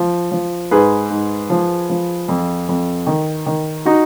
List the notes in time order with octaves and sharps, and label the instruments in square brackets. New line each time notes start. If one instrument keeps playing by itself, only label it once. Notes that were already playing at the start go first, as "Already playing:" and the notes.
Already playing: [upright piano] F3
F3
G#2 G#4 B4
G#2
F3
F3
F2
F2
D#3
D#3
D#4 F#4